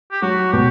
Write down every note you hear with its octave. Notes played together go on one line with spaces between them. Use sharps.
G4
F#3 F#4
B2 G4